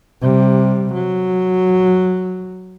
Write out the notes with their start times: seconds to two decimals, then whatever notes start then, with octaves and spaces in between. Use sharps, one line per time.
0.21 C3 G3
0.93 F#3